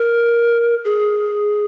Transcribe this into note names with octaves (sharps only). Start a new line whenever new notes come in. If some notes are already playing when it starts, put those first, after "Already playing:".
Already playing: A#4
G#4